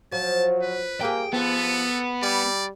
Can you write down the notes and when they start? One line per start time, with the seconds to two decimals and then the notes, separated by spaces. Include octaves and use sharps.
0.12 F3 F#3 A5
0.62 B4
1.01 A#3 G4 G#4 G5
1.33 F3 B3 A4
2.22 G3 D5